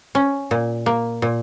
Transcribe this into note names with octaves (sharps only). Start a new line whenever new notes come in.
C#4
A#2
A#3
A#2